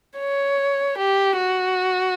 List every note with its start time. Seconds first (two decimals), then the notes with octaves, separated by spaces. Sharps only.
0.19 C#5
0.98 G4
1.37 F#4